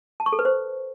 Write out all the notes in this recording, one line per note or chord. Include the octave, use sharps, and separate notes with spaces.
A5
C#6
A4
B4
C5